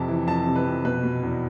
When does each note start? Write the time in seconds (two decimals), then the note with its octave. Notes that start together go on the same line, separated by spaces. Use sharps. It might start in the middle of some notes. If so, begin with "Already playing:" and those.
Already playing: F2 C3 A5
0.08 E3
0.27 F2 A5
0.47 C3
0.56 B4
0.66 F2
0.84 B2 B4
1.03 B2
1.23 E2